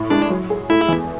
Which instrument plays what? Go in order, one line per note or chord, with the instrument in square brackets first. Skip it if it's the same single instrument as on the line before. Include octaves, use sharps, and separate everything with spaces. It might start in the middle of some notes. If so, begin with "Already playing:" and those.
Already playing: [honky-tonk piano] A2
[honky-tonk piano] G#3 [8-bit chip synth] D4
[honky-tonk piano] F#3
G#4
[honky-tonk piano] A3 [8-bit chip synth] E4
[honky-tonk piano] E2